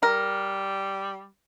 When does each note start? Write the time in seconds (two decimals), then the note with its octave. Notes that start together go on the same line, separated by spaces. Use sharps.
0.03 G3 A#4